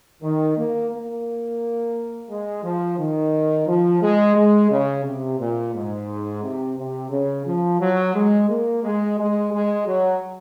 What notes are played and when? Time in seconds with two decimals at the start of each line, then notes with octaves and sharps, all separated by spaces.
0.22 D#3
0.57 A#3
0.91 A#3
2.30 G#3
2.64 F3
2.98 D#3
3.67 F3
4.02 G#3
4.36 G#3
4.70 C#3
5.04 C3
5.39 A#2
5.74 G#2
6.43 C3
6.77 C3
7.11 C#3
7.46 F3
7.81 F#3
8.15 G#3
8.49 A#3
8.83 G#3
9.18 G#3
9.52 G#3
9.87 F#3